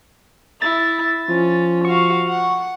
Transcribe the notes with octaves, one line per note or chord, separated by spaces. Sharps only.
E4 A6
F3 C#4
F#4 F5 C#6
F#5